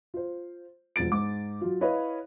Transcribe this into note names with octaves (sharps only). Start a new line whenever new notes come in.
F4 C5
E1 F3 A6 D7
G#2 D6
F#3 F4
E4 B4 C#5 D#5 F5